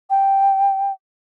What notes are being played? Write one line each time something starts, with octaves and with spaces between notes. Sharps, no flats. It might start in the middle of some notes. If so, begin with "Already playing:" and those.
G5